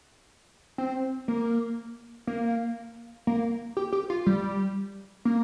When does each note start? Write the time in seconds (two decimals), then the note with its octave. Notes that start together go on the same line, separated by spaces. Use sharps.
0.78 C4
1.28 A#3
2.27 A#3
3.27 A#3
3.77 G4
3.93 G4
4.10 F4
4.26 G3
5.25 A#3